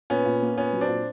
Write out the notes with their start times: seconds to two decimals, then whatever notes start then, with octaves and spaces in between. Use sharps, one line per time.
0.10 A#2 B3 C#4
0.25 A#2
0.42 A#3
0.57 A#2 B3 C#4
0.73 F#3
0.81 C4 D4
0.88 A#2